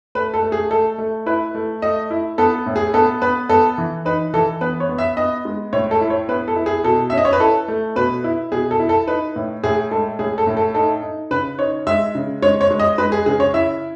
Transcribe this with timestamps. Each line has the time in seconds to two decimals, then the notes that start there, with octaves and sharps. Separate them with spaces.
0.15 A3 B4
0.34 A4
0.43 A3
0.52 G#4
0.71 A3 A4
0.98 A3
1.26 E4 B4
1.55 A3
1.82 A3 D#5
2.10 E4
2.38 B3 A4
2.66 A2
2.76 G#4
2.94 B3 A4
3.22 B3 B4
3.49 B3 A4
3.78 E3
4.05 D#4 B4
4.33 E3 A4
4.61 B3 B4
4.80 C#5
4.89 B3
4.98 E5
5.17 B3 D#5
5.45 G#3
5.73 A2 C#5
5.91 A4
6.01 E4
6.10 C#5
6.29 B3 B4
6.48 A4
6.56 E4
6.66 G#4
6.84 B2 A4
7.10 C#4 E5
7.18 D#5
7.25 C#5
7.33 B4
7.40 E4 A4
7.68 A3
7.96 B2 B4
8.24 E4
8.52 B2 G#4
8.71 A4
8.80 E4
8.89 A4
9.07 D#4 B4
9.36 A2
9.64 A2 G#4
9.91 G#3 A4
10.19 A2 G#4
10.38 A4
10.47 A2
10.57 A4
10.75 D#4 A4
11.03 D#4
11.31 C#3 B4
11.59 D#4 C#5
11.87 G#3 E5
12.15 C#3
12.42 G#3 C#5
12.61 C#5
12.71 G#3
12.80 D#5
12.98 G#3 B4
13.12 G#4
13.26 C#3 G#4
13.40 C#5
13.54 E4 E5